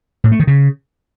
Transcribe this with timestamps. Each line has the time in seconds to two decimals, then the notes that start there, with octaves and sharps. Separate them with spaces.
0.24 A2
0.32 A3
0.40 D#3
0.47 C#3